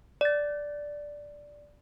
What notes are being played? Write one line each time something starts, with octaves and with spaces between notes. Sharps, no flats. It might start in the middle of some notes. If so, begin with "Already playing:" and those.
D5 A6